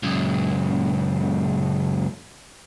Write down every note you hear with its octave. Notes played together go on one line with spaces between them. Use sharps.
C#2 F#2